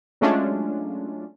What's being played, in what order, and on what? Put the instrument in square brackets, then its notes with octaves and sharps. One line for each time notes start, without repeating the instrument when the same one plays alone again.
[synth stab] F#3 G#3 A3 C#4 D4 F4